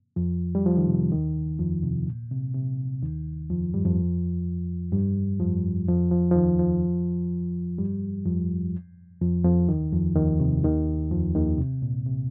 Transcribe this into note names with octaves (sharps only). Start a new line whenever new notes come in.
F2 F3
G3
F3
D#3
C3
D#2 D#3
F2 F3
C3
A#2
C3
C3
D#2 D#3
F2 F3
G2 G3
F2 F3
G2 G3
F2 F3
F2 F3
F2 F3
F3
D#2 D#3
F2 F3
G2 G3
F2 F3
F2 F3
F2 F3
D#2 D#3
F2 F3
D#2 D#3
C3
D#2 D#3
F2 F3
D#2 D#3
C3
A#2
C3